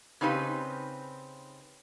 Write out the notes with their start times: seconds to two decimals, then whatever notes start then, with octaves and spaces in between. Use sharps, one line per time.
0.21 C#3 C4 D#4 G4 B4